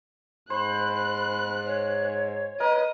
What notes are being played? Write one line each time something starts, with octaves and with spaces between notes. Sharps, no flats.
G#2 C5 B5 F#6
C#5
A#4 B4 D#5